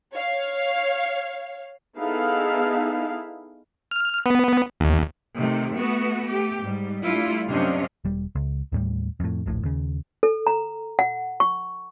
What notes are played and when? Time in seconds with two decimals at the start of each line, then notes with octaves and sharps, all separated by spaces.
0.14 C#5 F5
1.98 B3 D#4 E4 G#4 A4 F5
3.91 F6
4.26 B3
4.80 D#2
5.36 C3 D#3 A3
5.74 A3 B3 F#4
6.27 A3 G4
6.62 G#2 G3
7.03 G3 A3 D4 E4 F4
7.49 F#2 C3 C#4 D4 D#5 F5
8.05 E1 G3
8.35 C#2
8.72 D#2 A2 G3
9.20 F2 A2
9.46 D#1 A#1 A2
9.63 D#2 C#3
10.23 A4
10.47 A#5
10.99 F#5
11.40 C#6